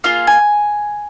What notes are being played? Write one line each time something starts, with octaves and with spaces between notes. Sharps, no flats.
A#3 F4 G#4 F5
G#5